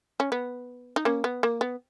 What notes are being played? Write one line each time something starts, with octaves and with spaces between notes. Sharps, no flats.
C#4
B3
D#4
A#3 C#4
B3
A#3
B3